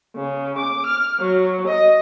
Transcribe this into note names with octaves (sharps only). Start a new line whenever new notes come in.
C#3
D6
F6
F#3
D#5